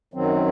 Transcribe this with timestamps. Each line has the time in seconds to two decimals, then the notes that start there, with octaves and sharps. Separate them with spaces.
0.14 F#2 D#3 F#3 C4